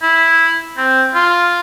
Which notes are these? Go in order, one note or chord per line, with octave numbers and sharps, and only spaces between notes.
E4
C4
F4